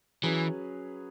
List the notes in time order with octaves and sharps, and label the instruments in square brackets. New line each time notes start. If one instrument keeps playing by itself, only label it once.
[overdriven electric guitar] E3 [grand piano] F#3 C#4 G#4 B4